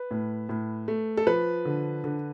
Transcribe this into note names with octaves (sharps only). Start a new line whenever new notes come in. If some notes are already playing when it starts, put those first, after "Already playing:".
Already playing: B4
A2
A2
A3
A4
F3 B4
D3
D3